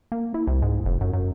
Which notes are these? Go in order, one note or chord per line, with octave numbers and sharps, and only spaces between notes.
A#3
E4
C2
G#2
F1
F#2
F#2